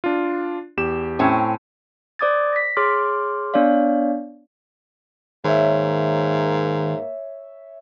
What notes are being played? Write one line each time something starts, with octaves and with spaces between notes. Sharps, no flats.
D4 F4
E2 G4 E7
A2 C4 C#4
C5 D5 D6 D#6 G#6 A6
A#6 B6
G#4 C#5 C6 D6 F6
B3 D4 C#5 D5 F5
G#2 D#3 A#3 C#5 E5